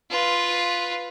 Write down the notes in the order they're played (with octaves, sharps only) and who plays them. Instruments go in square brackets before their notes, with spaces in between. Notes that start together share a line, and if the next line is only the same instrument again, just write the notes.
[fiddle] F4 B4